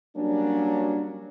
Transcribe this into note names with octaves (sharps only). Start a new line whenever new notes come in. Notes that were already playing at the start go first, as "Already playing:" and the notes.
F#3 G3 A#3 C#4 D4